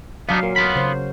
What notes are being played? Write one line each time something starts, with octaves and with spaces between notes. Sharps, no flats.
F#3 B3 D4 D#4 F5
A#2 A#4
B3 F4 B5
C#3 C5